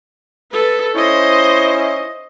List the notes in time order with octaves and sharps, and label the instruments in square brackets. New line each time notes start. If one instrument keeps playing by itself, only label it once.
[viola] A4 B4
[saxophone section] C#4 D#4 E4 [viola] C5 D#5